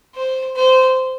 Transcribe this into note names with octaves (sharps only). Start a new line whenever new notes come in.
C5
C5